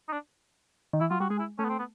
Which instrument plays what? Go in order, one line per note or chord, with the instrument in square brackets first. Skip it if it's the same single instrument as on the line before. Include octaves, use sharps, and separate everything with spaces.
[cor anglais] D#4
D4
[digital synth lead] D#3
[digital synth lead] E3 [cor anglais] E4
[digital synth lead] F#3 [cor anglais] F4
[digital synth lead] G3 [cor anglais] F#4
[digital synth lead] G#3 [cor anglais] G#4
[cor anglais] E4
[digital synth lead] A3 [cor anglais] C#4
[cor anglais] B3
C4
B3